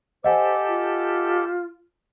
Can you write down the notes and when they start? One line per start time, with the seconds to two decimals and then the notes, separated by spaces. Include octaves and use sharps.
0.24 G4 A4 C5 D#5 F#5 G#5
0.68 F4